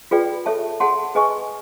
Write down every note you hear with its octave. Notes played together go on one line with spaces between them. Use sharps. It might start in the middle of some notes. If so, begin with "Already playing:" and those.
F4 G#4 B4 D5 G5
A4 C#5 E5 A5
G#4 C#5 F#5 A5 C6
G#4 B4 D#5 G#5 C#6